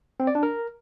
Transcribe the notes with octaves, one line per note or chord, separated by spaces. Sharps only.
C4
D5
D4
A#4